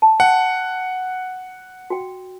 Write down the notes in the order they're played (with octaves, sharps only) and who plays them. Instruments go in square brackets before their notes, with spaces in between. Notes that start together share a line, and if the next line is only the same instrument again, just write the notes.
[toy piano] A5
[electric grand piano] F#5 [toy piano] G5
[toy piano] F#4 G5